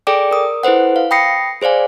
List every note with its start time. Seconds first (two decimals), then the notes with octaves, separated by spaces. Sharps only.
0.07 G#4 A4 D5 G5 D6
0.31 A#4 D#6
0.63 E4 A4 B4 C5 F#5
0.96 F5
1.11 G5 B5 D#6 A#6 C7 C#7
1.61 G#4 C5 D5 F5 G#5